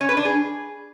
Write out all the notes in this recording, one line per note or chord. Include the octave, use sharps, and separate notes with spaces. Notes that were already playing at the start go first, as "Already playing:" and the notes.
C#4
B4
D4
G#4